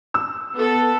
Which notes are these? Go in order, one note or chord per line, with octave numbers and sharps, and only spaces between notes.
E6
B3 A4